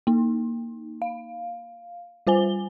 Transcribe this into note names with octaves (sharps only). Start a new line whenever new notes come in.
A#3 D#4
F5
G3 F4 C5 G#5 G7